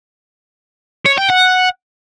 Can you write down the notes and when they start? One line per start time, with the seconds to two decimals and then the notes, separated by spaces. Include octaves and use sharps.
1.06 C#5
1.18 G5
1.30 F#5